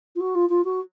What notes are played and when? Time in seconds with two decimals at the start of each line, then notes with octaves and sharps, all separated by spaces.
0.15 F4
0.20 F#4
0.35 F4
0.49 F4
0.64 F#4